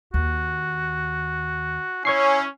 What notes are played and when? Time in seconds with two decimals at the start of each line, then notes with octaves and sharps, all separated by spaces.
0.14 D#2 F#4
2.05 C#4 E4 C#5 C#6 C7